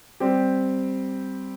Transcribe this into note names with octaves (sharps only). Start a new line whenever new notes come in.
G3 C4 G4